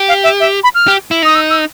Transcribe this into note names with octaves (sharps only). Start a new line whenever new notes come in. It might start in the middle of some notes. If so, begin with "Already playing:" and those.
Already playing: G4
F5
E5
E5
B5
F6
G4
E4
D#4 D#6
E6
E6